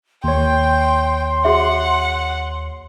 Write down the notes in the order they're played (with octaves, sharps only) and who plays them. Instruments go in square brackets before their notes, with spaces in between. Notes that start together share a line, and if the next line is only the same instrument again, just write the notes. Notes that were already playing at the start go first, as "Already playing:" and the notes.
[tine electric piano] D#2 C#5 [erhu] G5 [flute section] C6
[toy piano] F#4 G#4 E5 [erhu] F#5